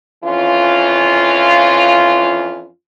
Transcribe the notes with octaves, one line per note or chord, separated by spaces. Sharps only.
F2 E3 C#4 F4